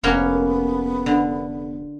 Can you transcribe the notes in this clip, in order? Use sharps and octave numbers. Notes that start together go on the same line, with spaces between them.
F1 A#3 B3 C#4 F#4
D3